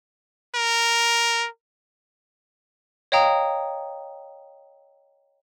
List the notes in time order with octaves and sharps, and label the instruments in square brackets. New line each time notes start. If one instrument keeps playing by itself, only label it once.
[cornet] A#4
[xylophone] C#5 D#5 F5 G5 A#5 D#6